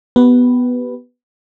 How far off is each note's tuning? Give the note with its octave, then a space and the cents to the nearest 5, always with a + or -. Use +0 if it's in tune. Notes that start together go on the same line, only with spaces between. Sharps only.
B3 +0 G4 -25 B4 +0